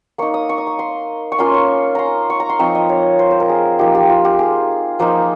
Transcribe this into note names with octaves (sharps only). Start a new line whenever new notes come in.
A#3 D#4 C#6
D#6
C#6
D#6
C#6
C6
C#6
A#3 C#4 F4 C6
C#6
A#5 C6
C#6
A#5
C6
F3 C4 D#4 C#6
D#5
C#5
C5
C5
A#4
G#4
F3 A#3 D#4 G4
G4
F4
G4
G#4
F3 A#3 D#4 C5